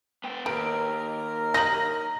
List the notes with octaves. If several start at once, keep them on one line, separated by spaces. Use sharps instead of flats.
B3 G5
D#2 A#4 B4 D7
D#3 F#3 D#4 A#6 F#7